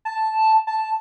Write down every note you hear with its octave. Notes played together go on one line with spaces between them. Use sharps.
A5
A5